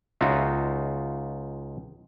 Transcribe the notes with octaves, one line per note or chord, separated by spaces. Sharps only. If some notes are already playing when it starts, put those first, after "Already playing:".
C#2 D#4 F4 F#4 E5